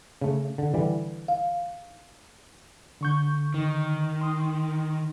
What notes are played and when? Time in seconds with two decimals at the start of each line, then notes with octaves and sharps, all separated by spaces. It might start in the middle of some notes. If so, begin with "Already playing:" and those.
0.21 C#3 A3
0.58 D3
0.74 D3 E3 G3
1.28 F5
3.01 D3 C#6 G6
3.54 D#3
4.21 C6 D#6